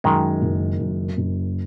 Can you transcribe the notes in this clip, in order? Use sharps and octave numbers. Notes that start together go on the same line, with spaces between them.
F#2 D#3 G#3
F#1
F#2
F#1